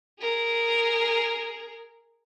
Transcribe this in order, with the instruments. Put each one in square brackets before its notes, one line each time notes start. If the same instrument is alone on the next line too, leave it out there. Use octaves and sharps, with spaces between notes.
[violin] G#4 A#4